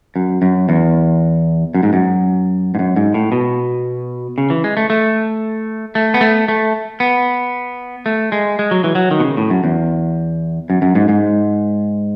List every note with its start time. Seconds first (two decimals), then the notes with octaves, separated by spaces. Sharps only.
0.16 F#2
0.42 F#2
0.69 E2
1.75 F#2
1.83 G#2
1.93 F#2
2.75 G#2
2.79 F#2
2.96 G#2
3.14 A2
3.32 B2
4.38 C#3
4.50 E3
4.64 G#3
4.77 A3
4.90 A3
5.95 A3
6.14 B3
6.21 A3
6.48 A3
7.00 B3
8.06 A3
8.32 G#3
8.59 G#3
8.71 F#3
8.84 E3
8.95 F#3
9.11 D#3
9.20 B2
9.24 C#3
9.37 A2
9.50 F#2
9.64 E2
10.70 F#2
10.82 F#2
10.95 G#2
11.09 G#2